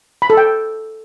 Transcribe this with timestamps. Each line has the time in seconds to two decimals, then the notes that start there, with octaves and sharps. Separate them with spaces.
0.22 B5
0.30 A4
0.37 G5